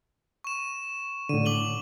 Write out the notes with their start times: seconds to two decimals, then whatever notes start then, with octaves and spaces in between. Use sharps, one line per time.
0.44 C#6 E7
1.29 A2 D3 D#7
1.46 D6 F#7 G7